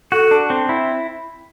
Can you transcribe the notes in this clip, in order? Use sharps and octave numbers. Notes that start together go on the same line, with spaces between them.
F#4 A4
D4
C4
E4